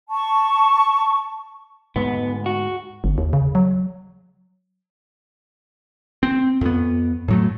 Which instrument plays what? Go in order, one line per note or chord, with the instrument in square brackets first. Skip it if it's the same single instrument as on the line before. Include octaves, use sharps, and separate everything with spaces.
[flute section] A5 C#6
[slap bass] D2 G#2 G#3 [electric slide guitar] B3
[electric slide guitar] F#4
[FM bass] G1
D#2
C#3
F#3
[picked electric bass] C4
F2 B3
A2 F#3 A3